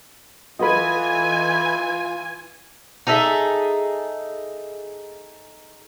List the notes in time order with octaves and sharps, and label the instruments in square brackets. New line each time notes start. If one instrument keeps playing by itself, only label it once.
[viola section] E3 G#5 [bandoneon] F4 [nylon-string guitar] A4 B4 F#5 [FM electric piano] D#5 B5
[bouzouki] D#4 G#4 A4 E5